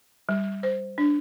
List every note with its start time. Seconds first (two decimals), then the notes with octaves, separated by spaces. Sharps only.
0.29 G3
0.63 C5
0.98 D4